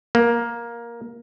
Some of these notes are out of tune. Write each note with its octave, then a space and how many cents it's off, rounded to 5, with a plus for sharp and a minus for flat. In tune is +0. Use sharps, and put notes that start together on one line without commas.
A#3 +10